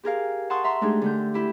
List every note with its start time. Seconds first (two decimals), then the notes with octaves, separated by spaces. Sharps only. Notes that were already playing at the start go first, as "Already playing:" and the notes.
0.04 G4 G#4 A#4 F5
0.50 F#5 A5 C6 C#6 D#6
0.64 E5 A#5 C6
0.81 G#3 A3 D4 D#4 G4 G#4
1.02 D3 A3 G6
1.34 E4 G4